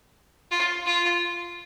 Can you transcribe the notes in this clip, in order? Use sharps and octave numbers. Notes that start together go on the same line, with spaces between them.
F4
F4